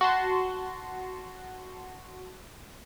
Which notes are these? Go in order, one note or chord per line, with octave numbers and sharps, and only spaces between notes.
F#4 A5 C6